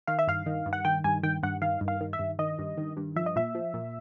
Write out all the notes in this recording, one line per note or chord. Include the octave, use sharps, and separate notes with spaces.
D#3 F5
E5
G2 F5
D#3
G2
F#5
D#3 G5
G2 G#5
D#3 G5
G2 F#5
D#3 F5
G2
F5
D#3
E5
G2
D#3 D#5
G2
D#3
G2
F3 E5
D#5
A#2 E5
F3
A#2